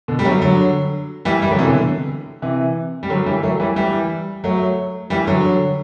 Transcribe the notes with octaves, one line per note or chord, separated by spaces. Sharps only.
B2 D3
G3
F#3 A3
D3 F#3
E3 G3
E3 G3
D3 F#3
C3 E3
B2 D3
C3 E3
G3
D3 F#3
E3 G3
F#3 A3
E3 G3
E3 G3
F#3 A3
E3 G3
D3 F#3